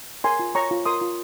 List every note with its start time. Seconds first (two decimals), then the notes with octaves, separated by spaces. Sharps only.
0.24 A#4 G#5 C6
0.39 F4
0.55 C#5 A#5 C#6
0.71 F4
0.86 A#4 C6 D#6
1.01 F4